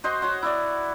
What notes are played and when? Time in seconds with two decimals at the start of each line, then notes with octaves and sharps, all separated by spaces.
0.04 F#4 C5 D#5 C6
0.22 F#4 C#5 F#5
0.42 E4 D5